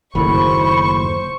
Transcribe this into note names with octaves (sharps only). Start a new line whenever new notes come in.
F#1 D#2 A2 C5 B5 C#6